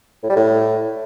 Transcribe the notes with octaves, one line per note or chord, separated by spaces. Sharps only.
A2
G3
A2